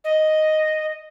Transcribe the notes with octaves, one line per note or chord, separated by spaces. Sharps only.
D#5